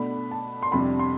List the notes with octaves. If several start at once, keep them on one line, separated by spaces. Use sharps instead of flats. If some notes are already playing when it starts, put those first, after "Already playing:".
Already playing: B2 A3 D4 B5
A5
C6
F2 C3 G3 D4 B5
C6